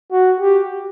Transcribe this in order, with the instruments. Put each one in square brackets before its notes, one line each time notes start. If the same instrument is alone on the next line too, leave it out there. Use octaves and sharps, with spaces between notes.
[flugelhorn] F#4
G4